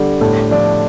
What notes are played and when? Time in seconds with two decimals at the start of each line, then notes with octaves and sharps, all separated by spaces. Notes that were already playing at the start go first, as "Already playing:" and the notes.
Already playing: D3 G3
0.21 A2
0.51 F3 D4